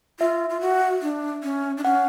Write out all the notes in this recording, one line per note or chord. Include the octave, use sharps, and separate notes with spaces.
F4 E5
F4
F#4
D4
C#4
D4
C#4 F#5